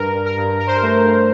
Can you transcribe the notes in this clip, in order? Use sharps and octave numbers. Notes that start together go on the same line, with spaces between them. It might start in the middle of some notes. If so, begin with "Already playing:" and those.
Already playing: G2 A#4
G2
A#4
G2
G2 A#4
C5
A#4
A3
G2